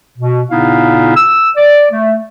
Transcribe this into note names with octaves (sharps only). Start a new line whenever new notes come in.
B2
A#2 C#3 B3 D#4 E4 F5
E6
D5
A3